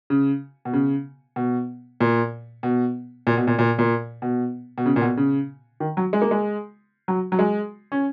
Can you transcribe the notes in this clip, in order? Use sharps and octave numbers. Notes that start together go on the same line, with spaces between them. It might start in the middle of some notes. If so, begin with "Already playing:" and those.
C#3
B2
C#3
B2
A#2
B2
A#2
B2
A#2
A#2
A#2
B2
B2
C#3
A#2
B2
C#3
D#3
F#3
G#3
A#3
G#3
F#3
F#3
G#3
C#4